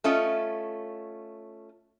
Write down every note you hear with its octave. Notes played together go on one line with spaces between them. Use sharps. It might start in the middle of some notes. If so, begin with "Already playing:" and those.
A3 C#4 F4 D#5